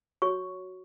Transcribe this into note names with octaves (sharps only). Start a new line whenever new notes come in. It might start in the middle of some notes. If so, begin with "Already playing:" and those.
F#4 C#5 C#6